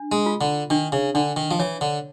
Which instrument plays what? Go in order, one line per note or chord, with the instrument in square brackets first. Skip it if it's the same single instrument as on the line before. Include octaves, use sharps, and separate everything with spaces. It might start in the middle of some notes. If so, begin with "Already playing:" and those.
Already playing: [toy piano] D4
[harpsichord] G#3
[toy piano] F4
[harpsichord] D3
[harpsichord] D#3 [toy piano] D4
[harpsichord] C#3
[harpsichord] D3 [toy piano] D4
[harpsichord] D#3
F3
[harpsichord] E3 [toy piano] C#5
[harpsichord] D3